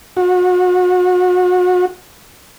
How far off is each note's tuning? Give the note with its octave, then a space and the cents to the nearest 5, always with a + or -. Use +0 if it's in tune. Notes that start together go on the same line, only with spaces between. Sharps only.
F#4 -35